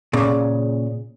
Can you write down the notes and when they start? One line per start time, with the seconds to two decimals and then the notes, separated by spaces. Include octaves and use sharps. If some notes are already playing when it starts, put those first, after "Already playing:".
0.13 A#2 C#3